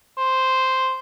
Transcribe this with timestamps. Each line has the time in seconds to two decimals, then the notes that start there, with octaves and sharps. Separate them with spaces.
0.18 C5